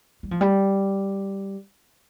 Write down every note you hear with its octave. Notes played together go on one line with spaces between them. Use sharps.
G3
F3
G3